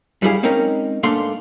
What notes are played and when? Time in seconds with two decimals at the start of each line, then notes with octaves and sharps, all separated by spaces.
0.22 F#2 G3 E4 G#4 F5
0.43 G#3 C4 C#4 D#4 A#4
1.03 G#2 A3 A#3 D4 F5 C6